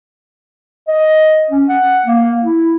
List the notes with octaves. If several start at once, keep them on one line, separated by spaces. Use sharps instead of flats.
D#5
C#4
F#5
A#3
E4